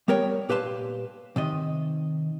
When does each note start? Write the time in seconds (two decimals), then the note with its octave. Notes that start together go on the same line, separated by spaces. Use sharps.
0.08 G3 B3 A#4 C#5 G5
0.49 A#2 G4 B4 F5 A5 C6
1.36 C3 D#3 D#5 E5